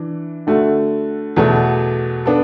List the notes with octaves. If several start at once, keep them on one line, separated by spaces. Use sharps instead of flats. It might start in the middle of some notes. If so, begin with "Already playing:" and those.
Already playing: E3 D4
D3 A3 F#4
E2 B2 A3 F#4 A4
B3 D4 A4